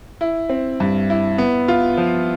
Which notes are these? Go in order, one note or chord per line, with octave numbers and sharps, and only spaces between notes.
E4
C4
G2
E4
B3
F4
F3